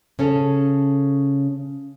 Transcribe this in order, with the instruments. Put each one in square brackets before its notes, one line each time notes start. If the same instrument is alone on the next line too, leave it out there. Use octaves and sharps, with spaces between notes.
[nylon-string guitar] C#3 C#4 A4